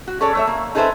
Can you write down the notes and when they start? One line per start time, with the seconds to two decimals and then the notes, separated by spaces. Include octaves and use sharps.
0.07 F#4
0.20 C#4 G#4 A4 C#5 D5
0.35 A3 C#5 E5
0.47 A#3
0.75 D#4 G#4 A4 B4 C5 E5